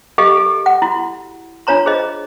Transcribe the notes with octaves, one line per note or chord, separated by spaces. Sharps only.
G4 A4 D#5 F5
A4
F#5
E4 F#4
D4 F4 C#5 A#5 C6
G#4 C5 D#5